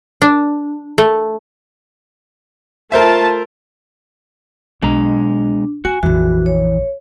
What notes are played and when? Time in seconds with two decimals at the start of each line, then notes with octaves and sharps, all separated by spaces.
0.22 D4
0.98 A3
2.92 A3 F4 A#4 C5 E5 A5
4.82 B1 B2 G#3 D4 A#5
5.85 A#3 F#4 G#5
6.03 A#1 F2 E3 F#4
6.46 C#5